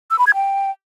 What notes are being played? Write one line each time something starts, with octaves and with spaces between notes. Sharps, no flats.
E6
B5
G#6
G5